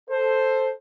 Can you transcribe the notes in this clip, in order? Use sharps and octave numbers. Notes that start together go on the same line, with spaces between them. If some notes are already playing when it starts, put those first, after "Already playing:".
A4 C5